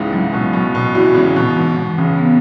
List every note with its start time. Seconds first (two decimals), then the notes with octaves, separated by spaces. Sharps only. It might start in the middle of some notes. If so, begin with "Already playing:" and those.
Already playing: C#2 G#2 C#3 E3 G#3
0.13 G#2 F#3
0.33 B2
0.53 B2 F#3
0.75 B2
0.94 E2 E3 F#4
1.15 C#2 C#3
1.36 B2 E3
1.57 G#2
1.76 B2 E3
1.98 C#2 C#3
2.19 B3